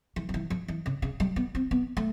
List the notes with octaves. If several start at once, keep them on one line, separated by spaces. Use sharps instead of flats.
E3
F3
E3
F3
E3
C#3
C#3
G3
B3
C4
B3
A3